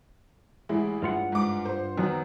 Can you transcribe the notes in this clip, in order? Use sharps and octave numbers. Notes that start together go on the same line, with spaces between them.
A1 G#3 E4
G2 F4 F#5
G#2 D6
C5
F#2 D#3 B3 C4